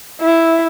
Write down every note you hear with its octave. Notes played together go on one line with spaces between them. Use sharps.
E4